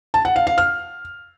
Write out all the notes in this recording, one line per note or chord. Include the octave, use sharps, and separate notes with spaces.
A5
F#5
F5
F5
F6